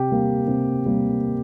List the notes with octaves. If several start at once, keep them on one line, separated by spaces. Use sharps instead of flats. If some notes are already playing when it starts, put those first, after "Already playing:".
Already playing: C3 G4
G3 A#3
C3
G3 A#3